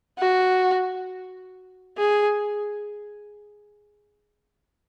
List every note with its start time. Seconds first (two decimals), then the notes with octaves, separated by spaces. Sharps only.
0.19 F#4
1.98 G#4